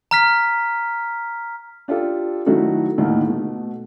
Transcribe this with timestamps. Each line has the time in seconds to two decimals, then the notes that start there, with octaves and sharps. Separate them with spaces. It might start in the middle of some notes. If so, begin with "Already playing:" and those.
0.11 A#5 F6 B6
1.88 D4 F4 G4 A4
2.46 D#3 F#3 A3 E4 F#4 A4
2.98 D#2 A2 D3 D#3 A#3
3.27 B2 A3